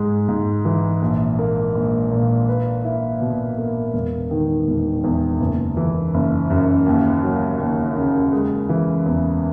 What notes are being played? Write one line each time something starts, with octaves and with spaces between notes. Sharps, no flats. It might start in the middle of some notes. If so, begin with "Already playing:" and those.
Already playing: G#2 G#3
G#2
E3
A#1
A#3
A#1
A#2
B4
E4
B2
A#3
E1
D#3
E1
E2
F#1
E3
F#1
F#2
D#2
F#3
D#2
C#3
G#3
E3
E2